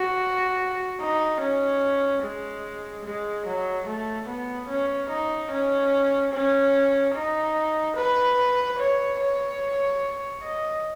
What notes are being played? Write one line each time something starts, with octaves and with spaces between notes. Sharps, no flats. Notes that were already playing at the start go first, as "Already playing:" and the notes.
Already playing: F#4
D#4
C#4
G#3
G#3
F#3
A3
B3
C#4
D#4
C#4
C#4
D#4
B4
C#5
C#5
D#5